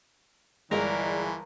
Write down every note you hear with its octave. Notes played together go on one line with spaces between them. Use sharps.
G1 E3 G#3 A#4 D5